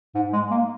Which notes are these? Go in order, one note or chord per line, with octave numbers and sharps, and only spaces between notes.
G#2
G#3
A#3